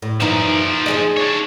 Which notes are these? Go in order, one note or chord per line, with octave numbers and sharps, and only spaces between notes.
A2
F#2 E3 F3 D#4 D5
D#4 G#4 D#5
D4 C#5